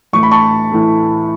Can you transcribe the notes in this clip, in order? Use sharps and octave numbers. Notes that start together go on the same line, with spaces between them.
A2 E3 A3 C#6
B5
A5 C#6
A2 E3 A3